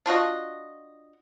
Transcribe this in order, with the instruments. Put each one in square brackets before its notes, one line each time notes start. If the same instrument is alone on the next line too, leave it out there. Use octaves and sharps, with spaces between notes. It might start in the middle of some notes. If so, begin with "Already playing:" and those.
[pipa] D4 F4 F#4 D#5